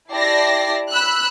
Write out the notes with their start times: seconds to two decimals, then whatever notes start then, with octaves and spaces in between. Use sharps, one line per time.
0.11 E4 G4 D5 A5 A#6 C7
0.92 B5 E6 F#6